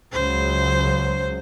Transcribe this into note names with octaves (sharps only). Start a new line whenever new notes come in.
C#2 C#3 F#3 C5